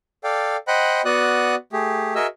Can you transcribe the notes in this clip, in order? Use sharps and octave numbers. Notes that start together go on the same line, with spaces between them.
A4 D5 F5 G5
C5 D#5 F#5 G5 B5 F#6
B3 F#4 D5 D#6 F#6
A3 G4 G#4
F#4 G#4 A#4 D#5 E5 E6